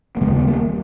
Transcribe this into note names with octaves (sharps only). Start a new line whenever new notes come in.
A#3
D#2 C#3 G#3 B3
B3
G3 A#3